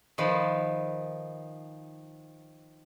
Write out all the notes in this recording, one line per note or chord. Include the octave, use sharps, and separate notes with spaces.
D#3 F3 D#4 B4